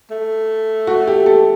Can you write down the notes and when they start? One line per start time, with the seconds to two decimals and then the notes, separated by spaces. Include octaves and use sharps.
0.11 A3
0.87 F#4
1.07 G4
1.26 A4